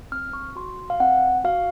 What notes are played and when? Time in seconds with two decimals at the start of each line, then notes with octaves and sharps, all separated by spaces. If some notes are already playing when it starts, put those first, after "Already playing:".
0.12 C4 F6
0.33 C#6
0.56 F#4 C6
0.90 F5
1.00 C4 F#5
1.44 F#4 F5